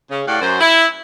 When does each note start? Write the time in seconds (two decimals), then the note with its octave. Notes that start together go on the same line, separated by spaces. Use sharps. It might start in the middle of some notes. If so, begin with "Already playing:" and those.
0.10 C#3
0.27 A2 G4 D5 F5 F#5
0.41 F#2 C5
0.60 E4